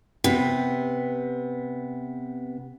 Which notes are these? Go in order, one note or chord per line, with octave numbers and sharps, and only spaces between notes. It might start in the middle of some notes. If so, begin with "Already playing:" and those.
C3 B3